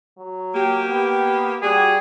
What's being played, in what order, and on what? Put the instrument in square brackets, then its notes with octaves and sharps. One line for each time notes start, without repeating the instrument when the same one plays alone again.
[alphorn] F#3
[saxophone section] A#3 G4
[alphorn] B3
[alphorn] G3 [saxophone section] F#4 [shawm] G#4